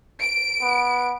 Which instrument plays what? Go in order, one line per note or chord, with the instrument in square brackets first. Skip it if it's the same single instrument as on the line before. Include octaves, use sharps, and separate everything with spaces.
[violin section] D7
[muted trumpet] B3